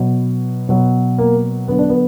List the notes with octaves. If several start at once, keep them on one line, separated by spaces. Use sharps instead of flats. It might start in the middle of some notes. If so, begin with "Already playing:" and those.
Already playing: B2 F#3
B2 F#3
A#3
D3 F#3 B3
D4
B3